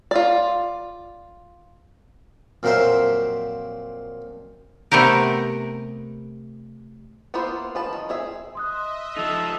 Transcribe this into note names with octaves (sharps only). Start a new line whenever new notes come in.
F4 D5
F2 A#2 F#3 A#4 C5 E5
C3 A3 B3 G4 A#4
A#3 B3 E4 F4 C5
F3 B4 A5
D#3
C4 G#4 E5
D#5 E5 C6 D#6 F#6
F3 D#4 A4